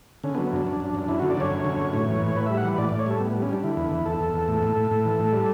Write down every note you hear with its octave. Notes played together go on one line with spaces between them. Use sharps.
D3 C#4
B3
F#3
B3
F#2 D4
F#2
F#2
F#2
F#2 E4
D3 F#4
D5
D3 C#5
F#2
D3
F#2
A2
E3
A2
A2 B4
G3 E5
F#5
E3 B4
A2 D5
A2 D5
C#5
G3 A4
A2 B3
G3 B3
C#4
G3 D4
D3 E4
E2
E2
E2 A4
E2
E2
A2
A2
A2
A2
E3
A2
G3